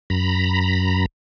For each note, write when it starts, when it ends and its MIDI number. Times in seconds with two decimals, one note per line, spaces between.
0.10 1.06 42
0.10 1.06 82
0.10 1.06 83